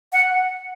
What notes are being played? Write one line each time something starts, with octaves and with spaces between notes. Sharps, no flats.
F#5